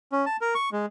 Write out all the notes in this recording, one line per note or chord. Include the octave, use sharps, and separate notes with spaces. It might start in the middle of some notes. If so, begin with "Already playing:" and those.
C#4
A5
A#4
C#6
G#3